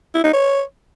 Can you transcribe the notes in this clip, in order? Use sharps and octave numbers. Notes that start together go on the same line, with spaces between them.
E4
D#4
C#5